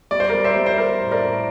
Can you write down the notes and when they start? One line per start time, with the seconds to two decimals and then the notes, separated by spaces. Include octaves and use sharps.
0.11 G3 D5
0.20 C5
0.29 G3 A#4 D5
0.44 C5 E5
0.56 G3
0.66 C5
0.78 G3 A#4
1.01 A2
1.11 A#4 D5
1.23 A2